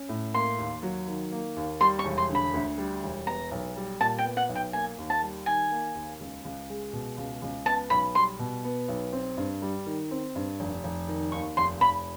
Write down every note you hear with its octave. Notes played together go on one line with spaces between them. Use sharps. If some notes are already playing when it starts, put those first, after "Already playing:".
Already playing: C#4
A2
A#3 C6
D#2
F#3
D#3
A#3
D#2
G3 C6
C#6
E1
C6
D3
B5
D2
G3
E1
B3 A#5
B1
G3
A#2 A5
G5
B3
F#5
B1
G5
A#3 G#5
D#2
A5
G3
D#3 G#5
A#3
D#2
C#2
C#2
G#3
B2
C#2
C#2
B3 A5
B1 B5
G3 C6
B2
B3
B1
C4
G2
G3
D#3
C4
G2
F1
F1
D#3
D#2 C#6
F1 C6
F1 B5